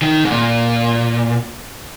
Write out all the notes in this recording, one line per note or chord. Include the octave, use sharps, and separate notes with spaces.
D#3
G#2
A#2